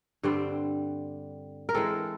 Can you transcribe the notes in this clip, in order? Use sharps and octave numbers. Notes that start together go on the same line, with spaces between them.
G2 D3 G3 C4
A#4
E3 G#3 C4 A4